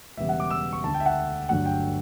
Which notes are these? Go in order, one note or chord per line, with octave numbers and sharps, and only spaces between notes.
E1 E2 C#3 G3 B3 E5
F#5
D6
E6
C#6
D2 D3 A3 A5
G5
E5
F#5
G1 G2 D3 F#3 A3 F#5
G5